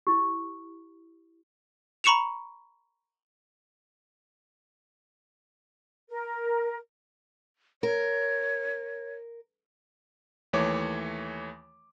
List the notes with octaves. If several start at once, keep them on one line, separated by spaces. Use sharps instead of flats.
E4 G4
A#5 B5 C#6 C#7 E7 F7
A#4
A#4 C#5
D#2 E3 A3 C#5 D6